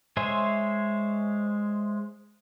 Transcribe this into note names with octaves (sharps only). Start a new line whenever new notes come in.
G#3 C5 C#5 E5 G#5